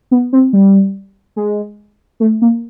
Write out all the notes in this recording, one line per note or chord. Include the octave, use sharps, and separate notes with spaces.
B3
C4
G3
G#3
A3
A#3